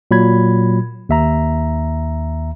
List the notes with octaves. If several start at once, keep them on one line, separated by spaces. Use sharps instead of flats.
A#2 F#3 B5 G#6
D#2 E5 A#5